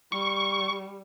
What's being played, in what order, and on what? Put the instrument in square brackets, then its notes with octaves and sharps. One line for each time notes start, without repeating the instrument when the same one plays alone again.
[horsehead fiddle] G3 [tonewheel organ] C#6